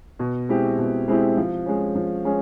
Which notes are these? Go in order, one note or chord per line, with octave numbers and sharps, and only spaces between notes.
B2
G#3 C4 E4 G4
B2
G#3 C4 E4 G4
F3
G#3 C#4
F3
G#3 C#4